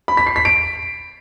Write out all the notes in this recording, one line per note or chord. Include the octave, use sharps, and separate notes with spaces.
B5
B6
C7
B6
D7